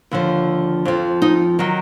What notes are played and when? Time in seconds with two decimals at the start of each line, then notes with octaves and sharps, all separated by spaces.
0.11 D#2 D3 F3
0.85 F2 F3
1.22 D#4
1.59 D#3 F#3